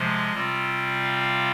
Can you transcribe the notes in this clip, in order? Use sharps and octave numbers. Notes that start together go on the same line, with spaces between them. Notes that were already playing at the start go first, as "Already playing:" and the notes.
Already playing: C3 F3 G#3 D#5
C3 G3 C4 F4
F5